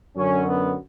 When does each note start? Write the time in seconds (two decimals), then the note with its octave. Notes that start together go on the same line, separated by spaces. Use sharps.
0.17 F#2 D3 F#3 C#4
0.46 B3